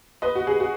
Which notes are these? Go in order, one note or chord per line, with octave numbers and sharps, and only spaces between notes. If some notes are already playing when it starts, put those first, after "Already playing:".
B4 D#5
F#4
G#4
F#4